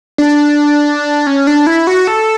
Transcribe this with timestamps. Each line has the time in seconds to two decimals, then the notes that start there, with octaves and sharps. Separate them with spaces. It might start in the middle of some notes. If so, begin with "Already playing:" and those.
0.18 D4
1.27 C#4
1.47 D4
1.67 E4
1.87 F#4
2.07 A4